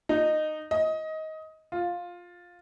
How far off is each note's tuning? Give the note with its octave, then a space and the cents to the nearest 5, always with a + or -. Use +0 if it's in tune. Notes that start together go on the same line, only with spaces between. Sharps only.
D#4 -15
D#5 +20
F4 +10